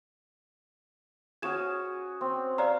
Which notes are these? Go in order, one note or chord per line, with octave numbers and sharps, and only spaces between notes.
C#4 F#4 G#4 G#6 E7
C4
C5 D5 F5 A#5